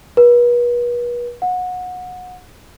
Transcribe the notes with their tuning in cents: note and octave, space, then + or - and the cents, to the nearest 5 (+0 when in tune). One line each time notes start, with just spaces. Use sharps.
B4 -40
F#5 -25